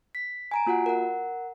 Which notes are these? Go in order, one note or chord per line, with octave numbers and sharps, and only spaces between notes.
B6
G#5 A#5 D7
A#3 F4 F#4 F#5
A#4 F#5